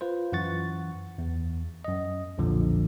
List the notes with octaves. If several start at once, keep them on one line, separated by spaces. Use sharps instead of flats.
F4 B4 C5
F#2 E3 F#5 C#6 A6
E2
F#2 D#5
B1 F2 A#2 D3 F3